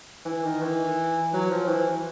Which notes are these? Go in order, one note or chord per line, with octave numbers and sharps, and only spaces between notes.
E3
D#3
E3
F#3
F3
E3